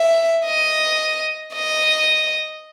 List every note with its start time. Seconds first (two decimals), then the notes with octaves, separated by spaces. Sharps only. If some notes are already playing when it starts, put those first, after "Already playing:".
Already playing: E5
0.45 D#5
1.54 D#5